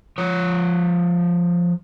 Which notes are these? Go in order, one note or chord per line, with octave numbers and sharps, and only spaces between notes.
F3 C#5